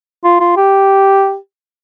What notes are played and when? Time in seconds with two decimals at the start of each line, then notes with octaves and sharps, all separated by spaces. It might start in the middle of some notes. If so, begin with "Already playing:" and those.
0.24 F4
0.40 F4
0.56 G4